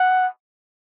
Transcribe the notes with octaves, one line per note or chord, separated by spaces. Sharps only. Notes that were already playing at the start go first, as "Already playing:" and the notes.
Already playing: F#5